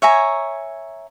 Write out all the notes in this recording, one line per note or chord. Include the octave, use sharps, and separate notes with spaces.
C#5 E5 G#5 A#5